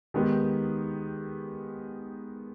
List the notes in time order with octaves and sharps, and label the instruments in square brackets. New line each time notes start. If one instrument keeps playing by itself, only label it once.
[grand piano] D#3 G#3 B3 D#4 G4